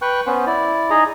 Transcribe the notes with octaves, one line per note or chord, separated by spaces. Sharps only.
B4 G5 C#6 F#6
B3 C#4 C5
E4 D5
D#4 G#4 D#5 A#5